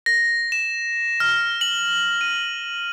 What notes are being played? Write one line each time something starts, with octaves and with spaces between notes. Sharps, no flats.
A#6
E7
F6
F#7
D#7